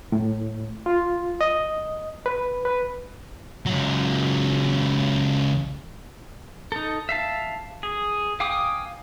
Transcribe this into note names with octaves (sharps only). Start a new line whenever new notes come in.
A2
F4
D#5
B4
B4
C#2 F#3
D#4 A4
E5 F5 A5
G#4
F5 G5 G#5 D6 D#6